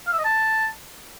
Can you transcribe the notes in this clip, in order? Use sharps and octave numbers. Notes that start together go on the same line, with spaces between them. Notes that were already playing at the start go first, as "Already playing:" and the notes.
F5
E5
D#5
A5